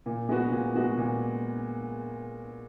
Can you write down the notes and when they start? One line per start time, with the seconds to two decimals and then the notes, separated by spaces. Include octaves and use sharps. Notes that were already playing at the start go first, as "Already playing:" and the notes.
0.06 A#2
0.29 G#3 B3 F#4
0.52 A#2
0.75 G#3 B3 F#4
0.98 A#2